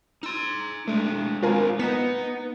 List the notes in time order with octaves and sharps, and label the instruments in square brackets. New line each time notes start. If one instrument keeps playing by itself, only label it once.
[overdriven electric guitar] D#4 C6 [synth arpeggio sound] E6
[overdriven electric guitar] G#3 D4 [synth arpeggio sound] A3
[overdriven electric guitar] G#3 C4 [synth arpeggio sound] F4 A#4 G#5
[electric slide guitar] B3 [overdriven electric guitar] D#4 D#5 [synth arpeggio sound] B6 E7